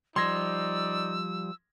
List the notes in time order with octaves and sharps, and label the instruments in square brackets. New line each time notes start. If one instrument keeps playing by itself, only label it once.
[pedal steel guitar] F3 G3 [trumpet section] D#4 D5 [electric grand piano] C6 G#6 A#6 [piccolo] E6